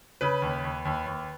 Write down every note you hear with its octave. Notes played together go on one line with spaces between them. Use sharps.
C#3 B4
D#2
D#2
D#2
D#2